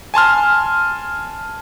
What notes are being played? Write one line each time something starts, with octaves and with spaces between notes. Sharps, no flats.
G#5 A5 C6 F6